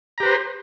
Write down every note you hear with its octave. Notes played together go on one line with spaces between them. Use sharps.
G4 B4 C5 A#5